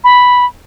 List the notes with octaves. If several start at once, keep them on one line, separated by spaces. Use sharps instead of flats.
B5